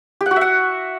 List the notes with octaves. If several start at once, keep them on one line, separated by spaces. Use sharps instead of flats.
G4
F#5
F#4
E5
F#5